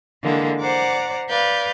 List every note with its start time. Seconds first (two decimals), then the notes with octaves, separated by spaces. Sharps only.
0.22 D3 E3 G#3 A#3
0.60 C5 D5 F#5 A#5 D6
1.28 B4 D5 F5 G6